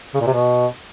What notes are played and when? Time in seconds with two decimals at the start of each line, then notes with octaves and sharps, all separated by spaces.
0.15 C#3
0.21 A#2
0.27 C3
0.33 B2